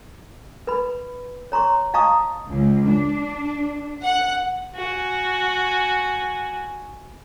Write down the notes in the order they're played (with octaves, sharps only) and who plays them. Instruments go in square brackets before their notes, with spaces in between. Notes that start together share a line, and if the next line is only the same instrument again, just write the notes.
[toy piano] B4 B5
C#5 A#5 C6 C#6
D#5 F5 A5 A#5 C#6 D#6
[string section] C#2
D4
F#5
[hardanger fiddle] F#4 G#5